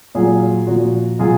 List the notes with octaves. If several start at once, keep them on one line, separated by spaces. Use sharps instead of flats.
A#2 F#3 F4 G#4
A#2 F3 F#4
B2 F#3 F4 G#4